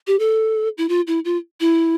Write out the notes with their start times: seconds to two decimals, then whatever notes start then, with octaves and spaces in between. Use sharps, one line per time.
0.07 G4
0.19 A4
0.78 E4
0.89 F4
1.07 E4
1.25 F4
1.60 E4